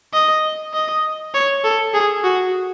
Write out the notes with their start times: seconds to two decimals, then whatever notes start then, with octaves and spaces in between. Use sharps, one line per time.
0.14 D#5
0.74 D#5
1.34 C#5
1.64 A4
1.94 G#4
2.24 F#4